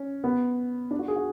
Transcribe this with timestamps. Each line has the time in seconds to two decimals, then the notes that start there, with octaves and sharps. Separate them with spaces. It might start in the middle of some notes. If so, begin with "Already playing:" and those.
Already playing: C#4
0.24 B3
0.91 D4
0.99 F#4
1.08 G#4
1.16 F#4